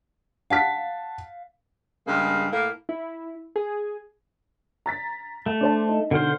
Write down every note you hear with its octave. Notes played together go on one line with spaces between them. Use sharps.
F5 F#5 A5 B6
G2 C#3 G#3 A#3
A2 A#3
E4
G#4
A#5 A6 B6
A3
D4 C5 A5
D#4
B2 D3 D#3 C5 F6